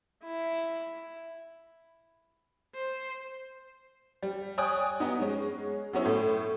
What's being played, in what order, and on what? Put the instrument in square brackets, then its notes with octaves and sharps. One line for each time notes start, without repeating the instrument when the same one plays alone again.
[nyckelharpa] E4
[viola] C5
[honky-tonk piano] G3
C#5 D5 G5 G#5 D#6 F#6
B3 D#4
G#3 C#4
F#3 B3 C#4 E4
A2 A3